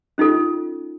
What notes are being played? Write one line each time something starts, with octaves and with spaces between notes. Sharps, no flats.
C#4 D#4 F4 A4